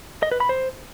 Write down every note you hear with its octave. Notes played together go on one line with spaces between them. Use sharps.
D#5
B4
B5
C5